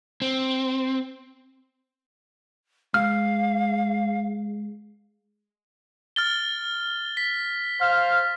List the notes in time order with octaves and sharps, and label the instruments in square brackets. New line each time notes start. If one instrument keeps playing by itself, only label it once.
[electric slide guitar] C4
[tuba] G#3 [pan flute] F5 [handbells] F6
[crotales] F6 A6 G7
B6
[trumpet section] C5 F5 [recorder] F6